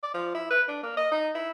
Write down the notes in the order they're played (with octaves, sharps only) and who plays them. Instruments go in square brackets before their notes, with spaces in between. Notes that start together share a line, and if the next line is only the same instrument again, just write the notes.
[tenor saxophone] D5
F3
E4
B4
D4
A#3
D#5
D#4
E4